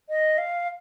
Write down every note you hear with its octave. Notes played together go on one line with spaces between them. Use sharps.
D#5
F5